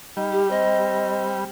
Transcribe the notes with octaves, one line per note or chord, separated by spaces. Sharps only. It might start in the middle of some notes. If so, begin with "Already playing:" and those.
G3 D#4
G4
C4 D#5